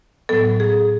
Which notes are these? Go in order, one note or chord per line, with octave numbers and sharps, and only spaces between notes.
A2 F#3 B3 A4
G#4